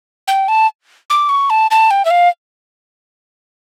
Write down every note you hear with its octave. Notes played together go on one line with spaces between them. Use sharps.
G5
A5
D6
C#6
A5
A5
G5
E5
F5